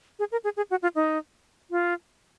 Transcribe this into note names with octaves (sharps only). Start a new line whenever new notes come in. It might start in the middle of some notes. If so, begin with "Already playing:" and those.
G#4
A#4
G#4
G#4
F#4
F4
D#4
F4